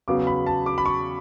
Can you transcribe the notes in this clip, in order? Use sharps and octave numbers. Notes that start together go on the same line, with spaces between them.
E2 C#3 F#3 B3 D6
B5
A5
D6
B5
C#6